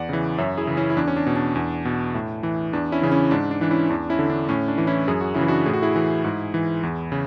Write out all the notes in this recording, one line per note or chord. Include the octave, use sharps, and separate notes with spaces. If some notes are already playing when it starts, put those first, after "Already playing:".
Already playing: E2 D5 F#5
C#3 E3
F#2 C#5 E5
E4 G#4
C#3 E3
C#4 E4
E4
E2 D4
C#4
D4
B2
D4
E2
B2
A2
E3
E2 D4
C#4 E4
C#3 E3
C#4 E4
G#2 D4
D4
E3 D4
C#4 E4
E2 D4
C#4 E4
D3
D4
A2 C#4
D4
E3
C#4 E4
F#2 G#4
F#4
C#3 E4
E3
D4 F#4
A2 G#4
F#4
E4 G#4
E3
G#2
E3
E2
C#3